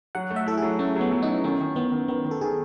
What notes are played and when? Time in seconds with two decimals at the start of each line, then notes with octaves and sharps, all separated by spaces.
0.15 F#3 F#5
0.30 A3
0.36 E5
0.46 E4 A4
0.57 G#4
0.63 F#3
0.79 A3 C#4
0.96 F#3 B3
1.12 F#3
1.23 D#4
1.28 E4
1.44 D#3 C#4
1.61 D#3
1.76 D#3 B3
1.92 D#3
2.08 D#3 B3
2.25 D#3
2.31 A4
2.41 D#3 G#4